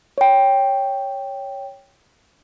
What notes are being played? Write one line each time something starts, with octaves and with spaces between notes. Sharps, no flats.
C#5 G5